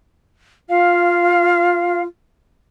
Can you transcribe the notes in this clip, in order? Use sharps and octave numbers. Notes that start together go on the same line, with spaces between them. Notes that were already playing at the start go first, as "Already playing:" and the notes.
F4 F5